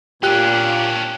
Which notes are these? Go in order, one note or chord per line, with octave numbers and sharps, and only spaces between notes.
A#2 C#4 D4 G4 G5 F#6